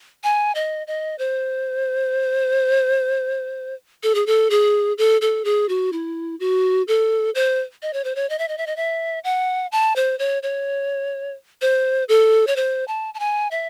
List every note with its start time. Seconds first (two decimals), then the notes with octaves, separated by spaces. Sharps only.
0.24 G#5
0.55 D#5
0.87 D#5
1.19 C5
4.03 A4
4.15 G#4
4.26 A4
4.50 G#4
4.98 A4
5.21 A4
5.45 G#4
5.69 F#4
5.93 E4
6.40 F#4
6.88 A4
7.35 C5
7.82 D#5
7.93 C#5
8.04 C5
8.15 C#5
8.30 D#5
8.39 E5
8.48 D#5
8.58 E5
8.67 D#5
8.77 E5
9.24 F#5
9.72 A5
9.96 C5
10.19 C#5
10.43 C#5
11.62 C5
12.09 A4
12.47 C#5
12.56 C5
12.88 A5
13.14 A5
13.19 G#5
13.51 E5